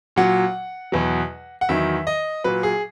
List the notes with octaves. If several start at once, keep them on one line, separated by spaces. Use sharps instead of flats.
A#2 F#3 F#5
E2 B2 F#3
F#5
E2 D#3 F#3 E5
D#5
A#2 F#3 B4
G#4